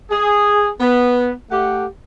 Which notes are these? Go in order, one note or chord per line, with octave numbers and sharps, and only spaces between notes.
G#4
B3
A3 G4 F#5